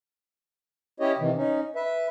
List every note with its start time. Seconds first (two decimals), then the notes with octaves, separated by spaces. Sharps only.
1.00 C#4 E4 G4 C#5 D#5
1.18 C3 D#3 E3
1.36 C#4 D#4
1.76 B4 E5